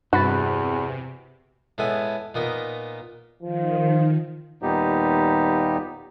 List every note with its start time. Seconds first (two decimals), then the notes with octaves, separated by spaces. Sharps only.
0.13 E2 G2 C3 F#4 B5 A6
1.78 A2 G#3 B3 A4 G#5
2.35 A#2 B3 D#4 A#4
3.43 D#3 F3
4.62 D#2 A#2 G3 B3 D#4 G4